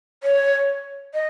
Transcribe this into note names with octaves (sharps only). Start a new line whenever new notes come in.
C#5
D#5